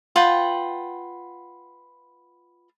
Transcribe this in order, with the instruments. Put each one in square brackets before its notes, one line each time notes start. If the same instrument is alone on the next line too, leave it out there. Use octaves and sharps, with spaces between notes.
[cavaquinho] F4 B4 F#5 G5